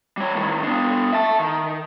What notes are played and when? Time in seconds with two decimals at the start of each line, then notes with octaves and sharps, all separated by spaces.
0.17 G3 C#5
0.35 A2 D#3
0.63 B3 D4
1.13 E5 A5
1.40 D#3